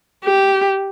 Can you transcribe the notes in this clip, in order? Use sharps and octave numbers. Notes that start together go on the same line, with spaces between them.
G4